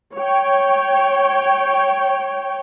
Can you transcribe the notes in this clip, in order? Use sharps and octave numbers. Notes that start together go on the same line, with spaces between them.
C#5 G5